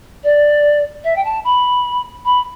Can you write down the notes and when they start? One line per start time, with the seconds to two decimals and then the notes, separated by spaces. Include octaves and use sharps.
0.23 D5
1.03 E5
1.15 G5
1.23 A5
1.44 B5
2.24 B5